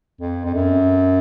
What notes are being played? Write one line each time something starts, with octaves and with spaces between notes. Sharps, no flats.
F2
F2
F#2